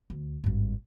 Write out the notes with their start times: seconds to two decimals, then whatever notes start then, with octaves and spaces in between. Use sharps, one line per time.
0.10 D2
0.44 G#1 G2